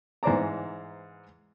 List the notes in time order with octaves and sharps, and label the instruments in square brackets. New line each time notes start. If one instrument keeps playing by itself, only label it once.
[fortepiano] G#2 E3 C5 D5 A#5